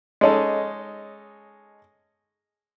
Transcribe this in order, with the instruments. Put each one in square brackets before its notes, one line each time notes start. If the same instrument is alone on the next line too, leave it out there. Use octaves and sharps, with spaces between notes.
[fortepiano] G#3 C#4 D#4 A4